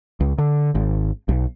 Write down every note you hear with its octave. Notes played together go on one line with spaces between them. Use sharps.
C#2
D3
G#1
B1